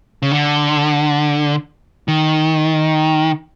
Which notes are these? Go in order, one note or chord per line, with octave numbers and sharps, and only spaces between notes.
C#3
D3
D#3